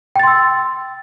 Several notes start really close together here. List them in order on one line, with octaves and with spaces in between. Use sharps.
G5 A6 C6 E6